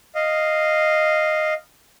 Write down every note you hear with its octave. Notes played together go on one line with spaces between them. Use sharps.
D#5 F5